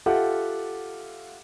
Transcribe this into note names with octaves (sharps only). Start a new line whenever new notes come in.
F4 G4 A4 E5 F#5